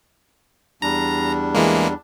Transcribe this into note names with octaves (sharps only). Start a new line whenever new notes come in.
E2 G3 D4 A#5
E3 G#3 A#3